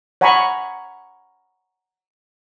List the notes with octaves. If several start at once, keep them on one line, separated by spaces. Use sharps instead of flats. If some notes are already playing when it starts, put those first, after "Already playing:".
C#5 F#5 G#5 A#5 B5 C#6